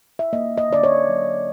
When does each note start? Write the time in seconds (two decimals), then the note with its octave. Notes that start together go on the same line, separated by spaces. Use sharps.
0.19 E5
0.33 A#3 D#5
0.58 D#5
0.70 D3 D5
0.83 C#5
1.08 F#3